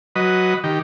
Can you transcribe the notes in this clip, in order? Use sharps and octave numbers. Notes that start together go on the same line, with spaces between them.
F#3 B4 D#5
D#3 G4